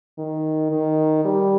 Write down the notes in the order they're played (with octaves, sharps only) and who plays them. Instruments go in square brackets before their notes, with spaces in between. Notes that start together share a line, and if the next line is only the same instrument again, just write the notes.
[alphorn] D#3
D#3
G3